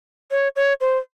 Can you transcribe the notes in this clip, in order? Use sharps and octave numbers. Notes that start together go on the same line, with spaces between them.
C#5
C#5
C5